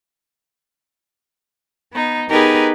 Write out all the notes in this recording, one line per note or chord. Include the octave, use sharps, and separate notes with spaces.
B3 D#4
B3 D#4 G4 G#4 A#4 B4